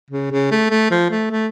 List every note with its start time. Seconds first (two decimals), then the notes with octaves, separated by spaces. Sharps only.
0.10 C#3
0.32 C#3
0.51 A3
0.70 A3
0.91 F3
1.10 A3
1.31 A3